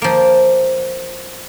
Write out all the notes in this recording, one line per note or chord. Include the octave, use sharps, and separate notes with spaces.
F3 A#3